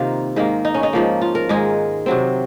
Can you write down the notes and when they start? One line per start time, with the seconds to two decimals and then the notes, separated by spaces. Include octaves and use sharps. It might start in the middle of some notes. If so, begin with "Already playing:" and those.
Already playing: C3 D#3 A#3 F4
0.36 G#2 D#3 A#3
0.65 D#4
0.74 C#4
0.83 D#4
0.93 G#2 F3 A#3
1.22 F4
1.35 A#4
1.49 G#2 D#3 G#3 G#4
2.06 C3 F#3 C4